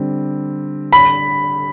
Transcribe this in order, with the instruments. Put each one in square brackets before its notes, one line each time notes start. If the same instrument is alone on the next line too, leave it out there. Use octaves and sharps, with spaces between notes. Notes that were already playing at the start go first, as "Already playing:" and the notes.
Already playing: [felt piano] D3 G3 C4
[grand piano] B5